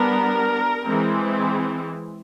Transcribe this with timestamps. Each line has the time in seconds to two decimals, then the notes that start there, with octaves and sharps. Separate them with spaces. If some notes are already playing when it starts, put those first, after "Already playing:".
Already playing: G3 B3 D4 A#4
0.84 E3 G#3 C4